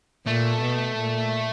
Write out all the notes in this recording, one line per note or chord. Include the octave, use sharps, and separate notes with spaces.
A#2 A3
B2
A#2